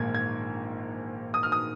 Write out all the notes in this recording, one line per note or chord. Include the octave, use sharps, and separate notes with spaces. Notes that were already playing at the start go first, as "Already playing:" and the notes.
Already playing: A#1 G#2 D#3 A#3 G#6
G#6
D#6
F6
D#6